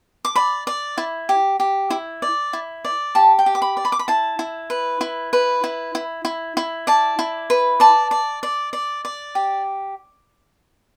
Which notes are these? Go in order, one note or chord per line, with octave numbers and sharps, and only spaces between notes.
D6
D5 B5
D5
E4
G4
G4
E4
D5
E4
D5
G4 A5
G5
G4
D6
B5
D5
B5
D6
B5
E4 A5
E4
B4
E4
B4
E4
E4
E4
E4
D5 A5
E4
B4
D5 A5
D5
D5
D5
D5
G4